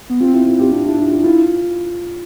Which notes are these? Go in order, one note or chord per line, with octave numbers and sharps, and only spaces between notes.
B3
C4 F4
E4
F4
G4
D4 F4
E4
E4
F4
E4 F4